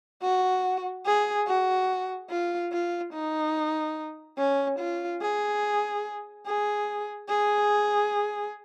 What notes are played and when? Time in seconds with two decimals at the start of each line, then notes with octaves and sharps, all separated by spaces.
0.22 F#4
1.05 G#4
1.47 F#4
2.30 F4
2.72 F4
3.13 D#4
4.38 C#4
4.79 F4
5.22 G#4
6.47 G#4
7.29 G#4